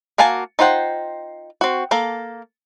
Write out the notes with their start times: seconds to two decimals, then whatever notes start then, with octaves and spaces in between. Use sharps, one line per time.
0.18 A#3 F#4 F5 G#5 A5
0.59 D#4 F4 C5 F#5 G5
1.61 C4 F#4
1.91 A#3 A4